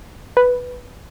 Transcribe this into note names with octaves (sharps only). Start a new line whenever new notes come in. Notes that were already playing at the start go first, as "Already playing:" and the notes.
B4